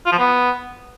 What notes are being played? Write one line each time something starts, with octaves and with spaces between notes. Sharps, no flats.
F4
F3
B3